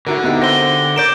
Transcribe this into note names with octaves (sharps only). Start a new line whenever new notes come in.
D3 E4 F#4 A#4
B3 D#4 G4
C5 E5 G5 A#6 G7
A#4 C#5 D5 G6 D7 E7